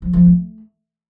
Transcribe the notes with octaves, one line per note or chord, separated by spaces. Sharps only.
F3
F3
A3